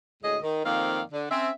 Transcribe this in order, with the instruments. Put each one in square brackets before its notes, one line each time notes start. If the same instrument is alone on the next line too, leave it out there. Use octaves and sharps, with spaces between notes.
[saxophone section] D2 A2 G#3 G#4 D#5
D#3
F2 D#3 A#3 C4 D5 F5
D3
C4 C#4 E5